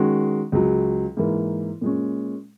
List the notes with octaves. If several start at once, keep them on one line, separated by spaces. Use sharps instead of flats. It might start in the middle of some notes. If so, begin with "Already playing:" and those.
Already playing: D#3 G#3 C#4 F#4
C#2 C#3 F#3
G#2 E3 A#3
A#2 G#3 C#4